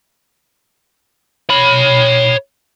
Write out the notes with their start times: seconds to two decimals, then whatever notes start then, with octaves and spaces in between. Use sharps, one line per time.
1.50 C#5 B5